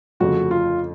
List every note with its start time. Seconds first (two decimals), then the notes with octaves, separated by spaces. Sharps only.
0.20 G1 F2 C#3 F3 A3 F#4
0.51 F4